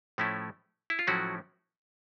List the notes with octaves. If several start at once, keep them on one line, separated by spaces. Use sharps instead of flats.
A2 F3 A3 C#4 E4
E4
F4
A2 F3 F#3 A3 C#4 E4 F#4